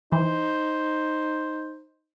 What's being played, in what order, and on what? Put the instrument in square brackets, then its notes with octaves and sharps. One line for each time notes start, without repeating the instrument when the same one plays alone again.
[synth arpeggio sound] E3 [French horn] D#4 [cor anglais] C5